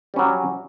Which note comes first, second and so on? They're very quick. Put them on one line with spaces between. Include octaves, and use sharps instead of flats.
G3 C#4 F#3